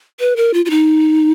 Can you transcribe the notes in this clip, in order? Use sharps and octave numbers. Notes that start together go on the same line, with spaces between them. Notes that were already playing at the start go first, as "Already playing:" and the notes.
B4
A#4
F4
F4
D#4